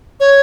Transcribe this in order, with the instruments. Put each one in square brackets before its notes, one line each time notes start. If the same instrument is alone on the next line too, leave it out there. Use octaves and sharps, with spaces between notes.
[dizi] C#5